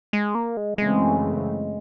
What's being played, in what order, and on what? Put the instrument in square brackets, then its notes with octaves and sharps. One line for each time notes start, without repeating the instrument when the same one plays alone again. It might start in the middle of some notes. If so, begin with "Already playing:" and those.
[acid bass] G#3
A#3
G#3
[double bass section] F#2 C#3 E3 A3 C4 [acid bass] G#3